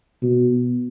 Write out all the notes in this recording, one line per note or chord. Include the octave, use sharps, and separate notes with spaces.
B2